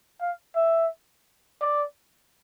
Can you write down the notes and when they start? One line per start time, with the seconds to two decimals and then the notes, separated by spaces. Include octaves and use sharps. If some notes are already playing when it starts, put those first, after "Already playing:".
0.21 F5
0.56 E5
1.61 D5